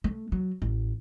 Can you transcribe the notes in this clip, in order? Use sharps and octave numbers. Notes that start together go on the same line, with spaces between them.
A3
F#3
A1